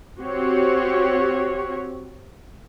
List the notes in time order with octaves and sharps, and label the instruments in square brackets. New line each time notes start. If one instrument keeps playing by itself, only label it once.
[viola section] C4 F#4 G4 C#5